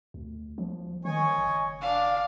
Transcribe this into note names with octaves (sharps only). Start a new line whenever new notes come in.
D2
F3
D#3 C#5 D#5 G#5
F#1
D4 F5